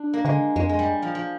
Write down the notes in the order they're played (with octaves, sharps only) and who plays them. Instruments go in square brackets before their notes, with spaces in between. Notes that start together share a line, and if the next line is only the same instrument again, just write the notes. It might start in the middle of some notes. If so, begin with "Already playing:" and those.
Already playing: [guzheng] D4
A#3
[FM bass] D3 [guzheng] G#3
[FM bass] F2 [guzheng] G#3
[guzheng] G#3
G3
F3
F3